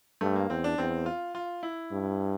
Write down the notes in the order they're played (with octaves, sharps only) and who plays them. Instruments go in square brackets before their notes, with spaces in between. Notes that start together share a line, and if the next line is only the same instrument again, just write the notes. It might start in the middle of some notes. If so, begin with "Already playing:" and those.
[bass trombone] G2 [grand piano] A3
[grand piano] A#3
[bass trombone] E2 [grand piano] C4
[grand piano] D4
[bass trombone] E2 [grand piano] C4
[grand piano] F4
F4
E4
[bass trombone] G2